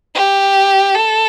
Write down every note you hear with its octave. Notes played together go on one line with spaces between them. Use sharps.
G4
A4